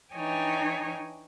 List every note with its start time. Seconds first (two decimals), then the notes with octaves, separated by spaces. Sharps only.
0.14 E3 D4 D#4 C#5 G5 G#5